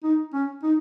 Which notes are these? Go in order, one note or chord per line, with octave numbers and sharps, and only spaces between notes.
D#4
C#4
D#4